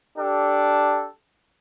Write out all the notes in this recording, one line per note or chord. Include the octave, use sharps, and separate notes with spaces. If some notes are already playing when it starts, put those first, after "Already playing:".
D4 G4 A4